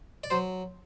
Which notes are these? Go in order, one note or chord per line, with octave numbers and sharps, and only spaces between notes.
D5
F#3 C5